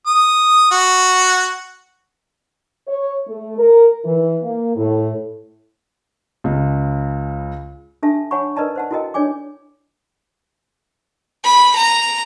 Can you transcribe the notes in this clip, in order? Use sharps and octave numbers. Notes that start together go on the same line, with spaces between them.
D#6
F#4
C#5
A3
A#4
E3
A#3
A2
C#2 C#3
D4 G4 A4 E5 A5
C#5 F#5 G#5 A5 B5 C#6
A#4 B4 D5 D#5 A5 A#5
C5 F#5 A5
E4 F#4 A4 A#4 D#5 G5
D4 A4 C#5 D5 G#5 D6
B5
A#5